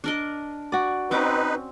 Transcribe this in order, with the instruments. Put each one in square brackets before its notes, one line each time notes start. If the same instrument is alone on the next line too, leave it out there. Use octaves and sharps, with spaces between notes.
[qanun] D4 A#4 D#5
[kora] F#4 D5
[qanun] C4 C#4 D6 [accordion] D#4 B4